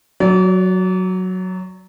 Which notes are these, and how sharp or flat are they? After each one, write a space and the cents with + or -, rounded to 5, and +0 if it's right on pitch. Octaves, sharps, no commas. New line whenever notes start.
F#3 +0 D5 -35